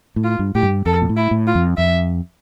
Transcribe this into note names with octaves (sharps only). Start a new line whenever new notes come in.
A2
F4
G2
A2 G4
G2
F2 A4
A#2
A2
E4
A2
F4
F2
F2 E5